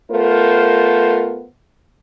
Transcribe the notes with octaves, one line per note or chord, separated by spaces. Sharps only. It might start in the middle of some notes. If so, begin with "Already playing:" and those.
A3 B3 F4 A#4 C5